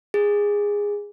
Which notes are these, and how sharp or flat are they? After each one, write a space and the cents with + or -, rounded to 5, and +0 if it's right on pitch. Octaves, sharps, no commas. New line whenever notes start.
G#4 -15